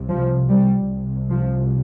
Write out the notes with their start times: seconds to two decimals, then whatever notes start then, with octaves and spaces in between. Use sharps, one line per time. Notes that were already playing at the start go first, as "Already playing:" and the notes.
Already playing: C2 C3
0.08 F3
0.49 G3
0.89 C2 C3
1.30 F3